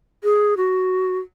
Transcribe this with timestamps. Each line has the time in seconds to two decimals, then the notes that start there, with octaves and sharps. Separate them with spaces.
0.24 G#4
0.57 F#4